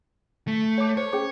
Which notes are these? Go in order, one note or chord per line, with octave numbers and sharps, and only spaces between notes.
A3
C#5 D6
C5 C#5
C#4 G#4 D6